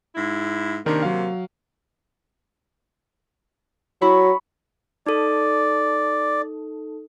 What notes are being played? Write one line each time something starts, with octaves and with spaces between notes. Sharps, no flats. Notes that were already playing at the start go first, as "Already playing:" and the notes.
G#2 E4
C3 D#3 A#3 D4 A#4
F#3 F5
F#3 E4 B5 C#6
D#4 A4 D5